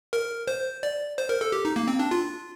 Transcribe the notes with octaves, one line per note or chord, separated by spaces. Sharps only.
A#4
C5
D5
C5
A#4
A4
G4
D#4
A#3
C4
D4
F4